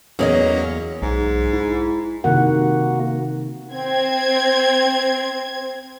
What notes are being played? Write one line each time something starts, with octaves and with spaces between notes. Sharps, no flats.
E2 F#3 A#3 C#4 G#4 C#5 D#5
B1 G#2
E4
C3 D#3 A#3 F#4 F#5
C4 G#6